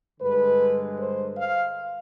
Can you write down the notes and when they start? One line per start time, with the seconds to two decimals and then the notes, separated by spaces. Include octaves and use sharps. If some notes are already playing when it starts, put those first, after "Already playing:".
0.20 G2 D3 G#3 B4
0.99 C5
1.38 F5